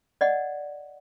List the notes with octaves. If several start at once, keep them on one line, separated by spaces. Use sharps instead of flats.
D5 D#5 F#5